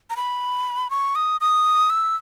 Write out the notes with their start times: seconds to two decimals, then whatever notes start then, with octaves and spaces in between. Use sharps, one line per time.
0.10 A#5
0.17 B5
0.90 C#6
1.15 D#6
1.41 D#6
1.90 E6